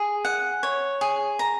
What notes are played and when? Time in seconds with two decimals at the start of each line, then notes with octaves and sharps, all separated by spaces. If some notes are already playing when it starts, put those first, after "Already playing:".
Already playing: G#4
0.25 F#5
0.63 C#5
1.01 G#4
1.39 A#5